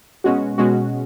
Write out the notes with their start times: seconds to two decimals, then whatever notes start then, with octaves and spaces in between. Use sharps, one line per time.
0.24 B2 G#3 C#4 F#4
0.58 B2 G#3 C#4 F#4